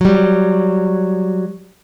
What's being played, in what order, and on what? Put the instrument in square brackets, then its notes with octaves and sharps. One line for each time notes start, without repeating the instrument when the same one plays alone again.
[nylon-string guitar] F#3 G3